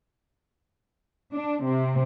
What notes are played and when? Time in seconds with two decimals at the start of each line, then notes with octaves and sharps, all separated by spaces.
1.33 D4
1.65 C3